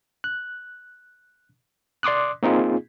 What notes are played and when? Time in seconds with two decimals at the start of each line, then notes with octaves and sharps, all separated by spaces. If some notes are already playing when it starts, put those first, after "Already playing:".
0.24 F#6
2.03 D5 C6 D6 D#6 F#6
2.43 A#3 C4 D#4 F4 G#4